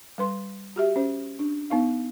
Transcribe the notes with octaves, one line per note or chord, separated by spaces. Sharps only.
G3 B4 C6
F#4 G4 E5
C#4 C5
D4
B3 D#4 F5